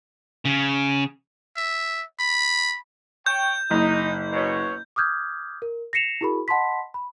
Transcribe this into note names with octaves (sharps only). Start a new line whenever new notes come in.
C#3
E5
B5
C#5 G5 G6
F#1 D#4
B2 C#5
D6 D#6 F6 G6 G#6
A#4
A#6 C7 C#7 E7 F7
E4 F#4 G#4 A#4 B5
D#5 F#5 A5 B5 C6 B6
B5